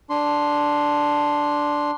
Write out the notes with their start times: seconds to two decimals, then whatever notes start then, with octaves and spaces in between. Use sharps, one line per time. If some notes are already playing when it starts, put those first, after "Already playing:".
0.10 D4 C6